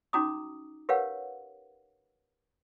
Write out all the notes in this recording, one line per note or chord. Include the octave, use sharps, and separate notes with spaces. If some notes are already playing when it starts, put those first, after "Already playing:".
C#4 D#4 F#4 A#5 D6 D#6
G4 A#4 B4 C#5 F5 F#5